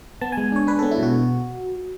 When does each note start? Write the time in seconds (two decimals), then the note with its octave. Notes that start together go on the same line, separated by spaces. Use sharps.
0.21 B3 A5
0.32 G#5
0.37 G#3
0.52 D4 C#5
0.67 D4 B4
0.79 A4
0.83 B3
0.91 E4
0.99 B2 F#4